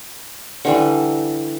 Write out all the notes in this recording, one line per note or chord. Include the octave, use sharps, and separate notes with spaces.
D3 E3 G3